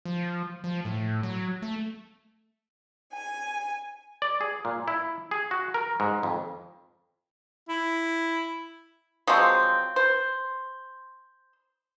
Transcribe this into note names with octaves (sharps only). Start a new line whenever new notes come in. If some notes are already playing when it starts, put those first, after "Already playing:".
F3
F3
A2
F#3
A3
G#5
D5
G#4
A#2
E4
G#4
F#4
A#4
G#2
F2
E4
F3 F#3 G#3 C4
C5